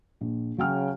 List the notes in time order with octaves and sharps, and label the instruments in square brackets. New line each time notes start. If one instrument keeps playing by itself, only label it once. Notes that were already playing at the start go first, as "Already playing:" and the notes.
[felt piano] A#1
[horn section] C#3 [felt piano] F#3 G5 F6